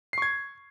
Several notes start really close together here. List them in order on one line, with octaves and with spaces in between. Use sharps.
C7 C#6 G#6